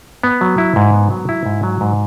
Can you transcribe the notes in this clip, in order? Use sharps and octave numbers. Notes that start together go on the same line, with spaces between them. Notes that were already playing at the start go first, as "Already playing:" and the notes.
B3
F#3
E4
G#2
B3
F#3
E4
G#2
F#3
G#2